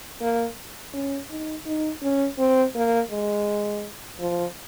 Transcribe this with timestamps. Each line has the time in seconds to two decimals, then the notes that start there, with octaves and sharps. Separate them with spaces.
0.21 A#3
0.94 C#4
1.30 D#4
1.66 D#4
2.02 C#4
2.38 C4
2.75 A#3
3.11 G#3
4.20 F3